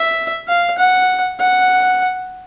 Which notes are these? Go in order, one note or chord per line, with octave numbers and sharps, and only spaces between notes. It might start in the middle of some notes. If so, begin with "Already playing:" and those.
Already playing: E5
F5
F#5
F#5